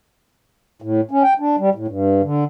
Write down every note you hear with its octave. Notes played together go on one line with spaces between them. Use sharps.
A2
C#4
G5
D4
G3
A2
G2
D3